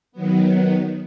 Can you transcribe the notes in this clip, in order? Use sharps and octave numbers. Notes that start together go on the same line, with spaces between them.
D#3 F#3 B3